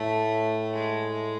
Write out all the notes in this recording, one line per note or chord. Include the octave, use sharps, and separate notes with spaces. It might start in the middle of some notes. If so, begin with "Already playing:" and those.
Already playing: A2 A3
G#3